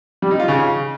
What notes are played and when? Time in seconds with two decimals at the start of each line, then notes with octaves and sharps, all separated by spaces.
0.22 G3
0.31 D#4
0.40 F4
0.48 C#3